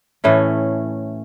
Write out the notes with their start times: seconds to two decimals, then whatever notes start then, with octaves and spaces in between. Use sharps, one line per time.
0.24 A2 E3 A3 C#4